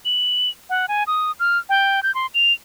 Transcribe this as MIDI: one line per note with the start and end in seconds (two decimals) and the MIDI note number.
0.05 0.50 102
0.70 0.86 78
0.88 1.03 80
1.07 1.32 87
1.40 1.58 89
1.69 2.03 79
2.03 2.14 91
2.15 2.27 84
2.34 2.53 101